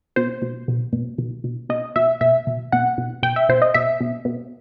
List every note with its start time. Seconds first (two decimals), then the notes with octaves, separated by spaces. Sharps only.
0.16 B2 C5
0.42 B2
0.68 B2
0.93 B2
1.18 B2
1.44 B2
1.69 B2 D#5
1.96 B2 E5
2.21 B2 E5
2.47 B2
2.72 B2 F#5
2.98 B2
3.23 B2 G5
3.36 E5
3.49 B2 C5
3.62 D#5
3.74 B2 E5
4.00 B2
4.25 B2